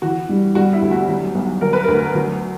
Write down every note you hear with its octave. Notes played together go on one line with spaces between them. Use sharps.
E3 F#4
G3
G3 F#4
E4
D2
F#4
F#3
B1
F#3 A#4
B4
D2 A#4
F#3